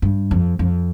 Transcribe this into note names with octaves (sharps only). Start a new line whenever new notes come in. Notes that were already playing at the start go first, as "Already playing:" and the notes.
G2
F2
F2